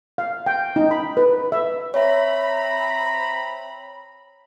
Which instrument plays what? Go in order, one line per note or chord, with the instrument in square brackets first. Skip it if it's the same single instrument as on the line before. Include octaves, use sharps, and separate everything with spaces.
[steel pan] F5
G5
D#4
B5
B4
E5
[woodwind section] C4 A#5 B5 [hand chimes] C#5 E5